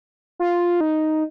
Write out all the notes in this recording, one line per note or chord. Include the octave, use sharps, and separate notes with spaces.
F4
D#4